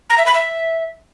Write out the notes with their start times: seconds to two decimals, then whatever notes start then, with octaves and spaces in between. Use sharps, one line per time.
0.10 A#5
0.18 E5
0.26 B5
0.34 E5